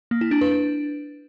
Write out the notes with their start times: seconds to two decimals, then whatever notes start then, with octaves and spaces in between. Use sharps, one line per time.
0.11 A#3
0.21 E4
0.31 D4
0.41 B4
0.51 D4